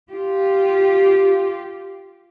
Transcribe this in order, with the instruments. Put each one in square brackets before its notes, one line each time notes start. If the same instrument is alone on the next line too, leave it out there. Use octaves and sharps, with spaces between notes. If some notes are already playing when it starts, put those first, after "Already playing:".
[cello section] F4 G4